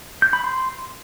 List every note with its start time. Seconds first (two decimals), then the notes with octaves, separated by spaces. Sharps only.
0.22 G6
0.33 B5
0.44 C6